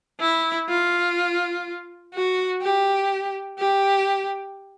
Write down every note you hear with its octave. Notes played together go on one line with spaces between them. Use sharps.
E4
F4
F#4
G4
G4